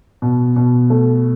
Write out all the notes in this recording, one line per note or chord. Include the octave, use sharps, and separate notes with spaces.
B2
B2
A3